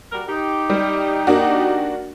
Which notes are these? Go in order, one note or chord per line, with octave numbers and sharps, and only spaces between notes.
G3 F#4 A#4
D#4 G4
G3
A#3 D4 F#4